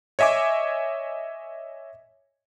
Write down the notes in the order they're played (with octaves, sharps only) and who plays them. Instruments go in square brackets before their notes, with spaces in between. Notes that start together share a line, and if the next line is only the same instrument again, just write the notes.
[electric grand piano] C#5 D#5 E5 G#5 D6